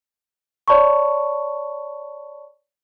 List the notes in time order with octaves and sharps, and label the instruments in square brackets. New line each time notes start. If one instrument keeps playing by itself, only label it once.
[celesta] C#5 D5 A5 B5 C#6